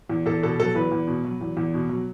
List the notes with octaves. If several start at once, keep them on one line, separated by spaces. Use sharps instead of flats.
E2
E2 A4
B2 A4
F#3 A4
E2 B4
E2
B2
F#3
E2
E2
B2
F#3